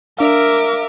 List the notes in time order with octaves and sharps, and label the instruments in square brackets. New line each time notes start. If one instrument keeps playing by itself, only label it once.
[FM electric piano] D4 F5 [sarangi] A#4 [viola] E5 D6